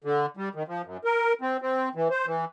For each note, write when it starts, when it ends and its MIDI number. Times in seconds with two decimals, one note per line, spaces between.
0.04 0.26 50
0.37 0.49 55
0.55 0.63 51
0.68 0.82 53
0.85 0.97 42
1.04 1.33 70
1.41 1.57 60
1.62 1.89 60
1.95 2.08 52
2.11 2.26 72
2.26 2.45 52